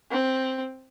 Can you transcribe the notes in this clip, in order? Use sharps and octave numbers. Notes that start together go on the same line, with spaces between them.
C4